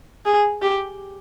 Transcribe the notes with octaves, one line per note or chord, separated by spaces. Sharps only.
G#4
G4